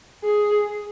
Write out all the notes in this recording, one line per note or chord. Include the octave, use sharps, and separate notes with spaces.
G#4